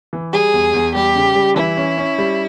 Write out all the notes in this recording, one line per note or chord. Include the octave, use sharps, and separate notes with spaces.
E3
G3 G#4
E2
E2
G3 G4
C#3
G3
E3 E4
C#4
C#4
G3